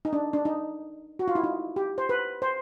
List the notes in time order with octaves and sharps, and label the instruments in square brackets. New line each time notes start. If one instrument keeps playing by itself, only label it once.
[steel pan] D#4
D4
D4
D#4
F#4
F4
E4
D#4
G4
C5
B4
C5